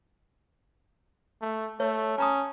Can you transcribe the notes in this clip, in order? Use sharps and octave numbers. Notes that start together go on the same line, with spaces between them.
A3
A3 C#5
C#4 A5 A#5 D#6